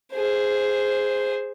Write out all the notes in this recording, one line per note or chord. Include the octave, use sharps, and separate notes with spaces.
G#4 C5